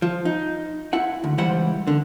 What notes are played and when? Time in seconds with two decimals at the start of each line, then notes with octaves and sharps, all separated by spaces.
0.02 F3
0.25 D#4
0.93 E4 F#5
1.24 D2
1.38 C#2 E3 G3 C5 F#5 B5
1.87 D3